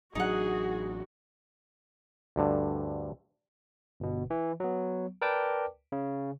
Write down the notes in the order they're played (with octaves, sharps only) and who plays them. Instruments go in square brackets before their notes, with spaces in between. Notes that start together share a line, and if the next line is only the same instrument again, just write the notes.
[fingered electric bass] A1 F#3 D4 [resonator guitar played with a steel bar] D#4 F#5 [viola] F#4 [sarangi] G#4
[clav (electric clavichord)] D2 G2 D3
[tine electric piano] G1 B2
E3
F#3 B3
A#4 B4 D5 G5 A5 D6
C#3